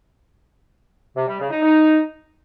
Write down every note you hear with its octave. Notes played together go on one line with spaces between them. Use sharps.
C3
G3
C#3
D#4
D#4